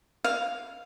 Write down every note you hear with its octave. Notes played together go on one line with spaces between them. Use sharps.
F5